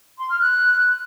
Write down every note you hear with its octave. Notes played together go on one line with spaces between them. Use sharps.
C6
F6
F#6